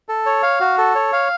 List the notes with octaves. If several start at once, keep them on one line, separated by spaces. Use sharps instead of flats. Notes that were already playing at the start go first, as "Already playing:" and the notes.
A4
C#5
F5
F#4
A4
C#5
F5